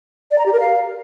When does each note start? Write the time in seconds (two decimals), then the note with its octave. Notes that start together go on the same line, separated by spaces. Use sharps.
0.31 D5
0.38 A#5
0.46 G4
0.53 A#4
0.60 F5